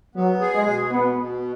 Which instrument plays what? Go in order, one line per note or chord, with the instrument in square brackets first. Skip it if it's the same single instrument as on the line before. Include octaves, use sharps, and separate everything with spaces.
[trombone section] F#3 [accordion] B3
[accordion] G#4
[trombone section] G#3
[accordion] B2
[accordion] B2 [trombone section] B3
[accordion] B2